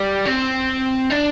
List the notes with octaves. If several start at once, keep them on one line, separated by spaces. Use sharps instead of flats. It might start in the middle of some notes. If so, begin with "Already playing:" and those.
Already playing: G3
C4
D4